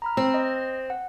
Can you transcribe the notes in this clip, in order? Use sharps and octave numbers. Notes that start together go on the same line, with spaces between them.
A#5 B5 F6
C4 E6
D#5
F#5